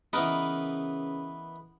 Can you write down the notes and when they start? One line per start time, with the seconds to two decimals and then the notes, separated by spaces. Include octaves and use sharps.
0.13 C#3 E3 B3 D#4 A#4 B4